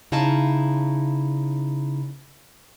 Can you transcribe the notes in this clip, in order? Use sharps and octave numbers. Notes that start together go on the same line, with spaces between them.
C#3 D#4 E4 D#5 F5 A5